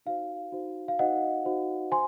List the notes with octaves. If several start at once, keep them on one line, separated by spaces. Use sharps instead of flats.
D#4 F#4 C5 F5
D#4 F#4 C5
F5
D#4 F#4 C5 D#5 F#5
D#4 F#4 C5
C5 G#5 C6